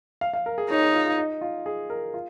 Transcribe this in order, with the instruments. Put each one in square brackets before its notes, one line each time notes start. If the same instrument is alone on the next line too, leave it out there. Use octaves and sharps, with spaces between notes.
[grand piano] F5
F5
A#4
G#4
[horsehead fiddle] D#4 [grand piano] C#5
[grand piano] G#4
F4
F4
D#4
F4
G#4
A#4
F4